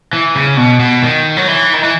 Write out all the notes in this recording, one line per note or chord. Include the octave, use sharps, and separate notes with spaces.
E3
C#3
B2
B2
D#3
F#3
E3
D#3
E3